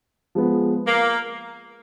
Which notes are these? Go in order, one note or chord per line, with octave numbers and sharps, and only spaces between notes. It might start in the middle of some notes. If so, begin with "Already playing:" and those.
F3 G#3 B3
A#3